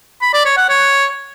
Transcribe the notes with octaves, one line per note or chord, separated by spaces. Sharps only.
B5
D5
C#5
F#5
C#5